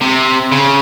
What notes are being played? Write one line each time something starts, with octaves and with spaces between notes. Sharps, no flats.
C3
C#3